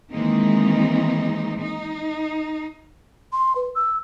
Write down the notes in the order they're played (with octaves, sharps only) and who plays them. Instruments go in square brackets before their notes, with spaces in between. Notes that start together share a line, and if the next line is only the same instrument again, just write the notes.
[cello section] D#3 E3 G#3 A#3 C4 D#4
D#4
[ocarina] C6
B4
E6